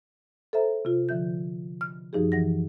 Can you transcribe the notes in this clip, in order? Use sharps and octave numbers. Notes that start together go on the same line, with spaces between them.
A4 C5 E5 A#5
C3 F4
D3 F3 E5 G6
F6
F#2 F3 D#4 G4 G#4
E3 F#5 A#6